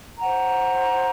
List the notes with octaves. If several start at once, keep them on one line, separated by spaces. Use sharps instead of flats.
C5 F#5 A#5